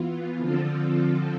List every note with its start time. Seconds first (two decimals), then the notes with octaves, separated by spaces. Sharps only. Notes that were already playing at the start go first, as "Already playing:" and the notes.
Already playing: E3 B3 F4
0.39 D3 F3 C4 F4 A4